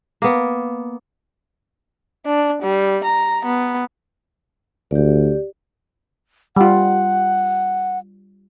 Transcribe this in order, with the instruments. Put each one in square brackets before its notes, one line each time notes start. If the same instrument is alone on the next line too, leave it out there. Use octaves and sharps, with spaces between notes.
[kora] A#3 B3
[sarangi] D4
G3
A#5
B3
[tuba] D2 [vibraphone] G4 D5
[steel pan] G3 F4 [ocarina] F#5